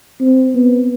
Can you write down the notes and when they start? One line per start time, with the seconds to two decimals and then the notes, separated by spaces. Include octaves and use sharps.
0.21 C4
0.55 B3